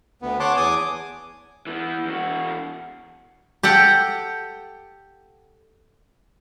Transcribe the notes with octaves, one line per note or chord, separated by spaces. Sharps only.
D2 B3
C#5 F#5 A5 C6 D6
E2 G#5 D6 D#6
E3 B3
E2 F#4
G4 A4 F#5 G5